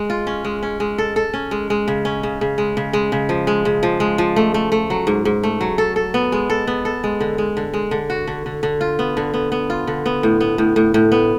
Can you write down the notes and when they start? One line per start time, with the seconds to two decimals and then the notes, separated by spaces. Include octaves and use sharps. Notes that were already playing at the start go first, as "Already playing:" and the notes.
Already playing: G#3
0.10 F4
0.27 C#4
0.45 G#3
0.63 C#4
0.80 G#3
0.98 A4
1.16 A4
1.34 C#4
1.51 G#3
1.70 G#3
1.88 C#3
2.05 C#4
2.23 C#3
2.41 C#3
2.58 G#3
2.77 C#3
2.93 G#3
3.12 C#3
3.29 F3
3.47 G#3
3.65 C#3
3.83 F3
4.00 G#3
4.18 F3
4.36 A3
4.54 A3
4.72 A3
4.90 F#3
5.07 G#2
5.25 G#2
5.43 A3
5.61 F#3
5.78 A4
5.96 A4
6.14 B3
6.32 G#3
6.50 A4
6.67 B3
6.85 A4
7.04 G#3
7.20 D3
7.38 G#3
7.57 D3
7.74 G#3
7.91 D3
8.10 F#4
8.27 D3
8.46 D3
8.63 D3
8.81 F4
8.99 B3
9.17 D3
9.34 B3
9.52 B3
9.70 F4
9.87 D3
10.06 B3
10.23 A2
10.40 B3
10.58 A2
10.76 A2
10.94 A2
11.12 B3